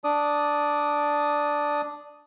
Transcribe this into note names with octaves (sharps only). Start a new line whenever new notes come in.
D4 D5 D#6